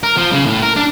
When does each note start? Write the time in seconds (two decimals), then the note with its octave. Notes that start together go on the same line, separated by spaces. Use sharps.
0.03 A#4
0.17 F3
0.32 C#3
0.46 A2
0.62 A#4
0.76 D4